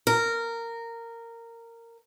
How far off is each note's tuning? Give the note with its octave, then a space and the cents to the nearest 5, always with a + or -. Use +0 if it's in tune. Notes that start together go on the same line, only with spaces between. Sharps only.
A#4 -15